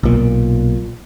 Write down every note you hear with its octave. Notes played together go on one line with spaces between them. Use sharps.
B1 A#2